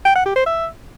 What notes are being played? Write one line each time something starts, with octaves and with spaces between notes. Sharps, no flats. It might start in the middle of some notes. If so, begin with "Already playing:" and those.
G5
F#5
G4
C5
E5